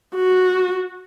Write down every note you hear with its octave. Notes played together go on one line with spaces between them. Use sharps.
F#4